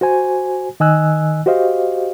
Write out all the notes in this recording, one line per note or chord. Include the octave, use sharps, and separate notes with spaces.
F#4 C5 G#5
D#3 D#5 G#5 E6 F#6
F#4 G4 C5 D#5 F5